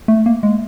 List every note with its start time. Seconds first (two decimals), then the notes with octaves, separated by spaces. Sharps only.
0.08 A3
0.26 A#3
0.43 G#3